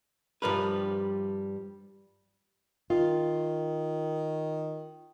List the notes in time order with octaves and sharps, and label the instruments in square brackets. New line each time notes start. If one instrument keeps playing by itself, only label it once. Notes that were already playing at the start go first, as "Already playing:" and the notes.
[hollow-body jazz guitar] G2 C3 F3 G3 A#4 B4
[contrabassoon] D#3 [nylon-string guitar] F4